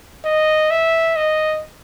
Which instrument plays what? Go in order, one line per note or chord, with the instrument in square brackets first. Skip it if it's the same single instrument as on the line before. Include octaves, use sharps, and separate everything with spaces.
[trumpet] D#5
E5
D#5